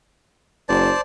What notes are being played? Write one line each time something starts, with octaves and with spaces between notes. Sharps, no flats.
F#1 C5 D5 A5